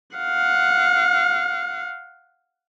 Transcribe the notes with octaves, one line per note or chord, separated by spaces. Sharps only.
F5 F#5